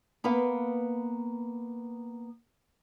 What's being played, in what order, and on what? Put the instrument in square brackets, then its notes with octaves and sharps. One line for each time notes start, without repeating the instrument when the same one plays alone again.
[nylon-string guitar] A#3 B3 B4 F5